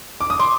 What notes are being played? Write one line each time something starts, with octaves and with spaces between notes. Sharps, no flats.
D6
D#6
C6 D6